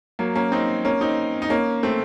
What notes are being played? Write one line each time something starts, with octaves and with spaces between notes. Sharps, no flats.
F#3 A#3
A#3 C#4
C4 D#4
A#3 C#4
C4 D#4
D#4
A#3 C#4
A3 C4